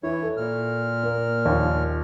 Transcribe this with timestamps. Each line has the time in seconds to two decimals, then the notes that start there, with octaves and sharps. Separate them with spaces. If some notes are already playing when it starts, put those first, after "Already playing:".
0.03 E3 E4 C#5
0.22 A4
0.37 A#2 F6
1.03 A#3
1.45 D#2 F3